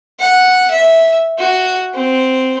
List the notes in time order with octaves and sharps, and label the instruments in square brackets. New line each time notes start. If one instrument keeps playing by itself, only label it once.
[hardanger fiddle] F#5
E5
F#4
C4